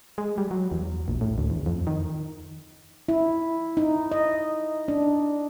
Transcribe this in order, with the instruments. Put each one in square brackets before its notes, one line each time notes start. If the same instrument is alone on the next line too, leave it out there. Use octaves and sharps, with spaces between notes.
[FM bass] G#3
G3
F#3
E2
A#1
A2
D2
E2
F2
D#3
[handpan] E4
D#4
D#5
D4